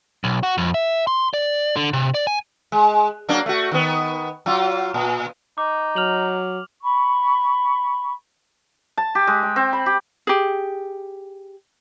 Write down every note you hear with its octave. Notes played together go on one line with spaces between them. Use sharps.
B1
F#4
F2
E5
C6
D5
D3
C3
D5
G#5
G#3
F#3 A#3 D4
A3 F#4
D#3 B3
F#3 F4
A#2
D#4 D6
F#3 F6 F7 F#7
B5 C#6
A5
G4
G#3
G5
C4
B5
G4
G4 G#4